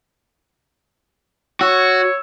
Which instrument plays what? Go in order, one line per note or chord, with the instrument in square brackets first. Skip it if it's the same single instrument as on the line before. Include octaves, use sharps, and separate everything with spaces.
[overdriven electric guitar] F#4 [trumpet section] C#5 [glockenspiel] E6 E7